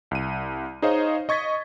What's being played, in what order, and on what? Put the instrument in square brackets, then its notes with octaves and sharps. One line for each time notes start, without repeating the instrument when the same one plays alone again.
[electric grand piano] C2 D#7
D#4 G#4 C5 C#5 D#5 F5
D#5 C#6 G#6 A6 B6